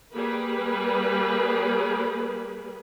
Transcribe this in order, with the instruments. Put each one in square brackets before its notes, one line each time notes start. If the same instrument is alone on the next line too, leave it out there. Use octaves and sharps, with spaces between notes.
[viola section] G3 A#3 G#4 B4